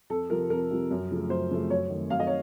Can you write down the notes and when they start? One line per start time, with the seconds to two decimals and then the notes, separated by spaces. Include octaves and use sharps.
0.10 F2 A4
0.30 C3 F3 A#4
0.50 F2 A#4
0.71 C3 F3
0.91 F#2
1.11 C#3 F3 A3
1.30 F#2 C5
1.51 C#3 F3 A3
1.70 F#2 C#5
1.90 D#3 A3
2.10 F#2 F5
2.20 D#5
2.27 C#5